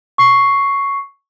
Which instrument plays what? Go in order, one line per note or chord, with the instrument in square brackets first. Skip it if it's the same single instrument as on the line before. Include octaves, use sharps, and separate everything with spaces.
[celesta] C#6 C7